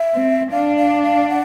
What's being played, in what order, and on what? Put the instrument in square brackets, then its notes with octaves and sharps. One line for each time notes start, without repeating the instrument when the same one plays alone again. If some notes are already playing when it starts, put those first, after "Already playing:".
Already playing: [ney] E5
[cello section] C4
[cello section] D4 [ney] F5
[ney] F5
F5
F#5